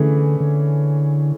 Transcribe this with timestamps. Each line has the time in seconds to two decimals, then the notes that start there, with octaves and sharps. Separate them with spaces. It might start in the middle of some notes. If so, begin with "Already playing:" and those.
Already playing: D3 E3 A3 C#4 G#4
0.40 D3